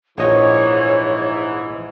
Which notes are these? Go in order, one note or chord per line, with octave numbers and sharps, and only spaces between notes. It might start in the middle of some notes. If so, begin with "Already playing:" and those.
A#1 G#2 E3 C#5 D#5